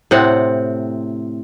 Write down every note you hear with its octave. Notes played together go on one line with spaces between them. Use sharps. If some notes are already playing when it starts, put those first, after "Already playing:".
A2 C3 C4 F#5